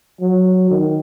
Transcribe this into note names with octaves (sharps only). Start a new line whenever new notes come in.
F#3
D#3